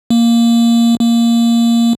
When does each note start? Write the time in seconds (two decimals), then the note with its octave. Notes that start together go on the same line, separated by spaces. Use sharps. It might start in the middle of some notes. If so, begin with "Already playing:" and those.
0.10 A#3
1.00 A#3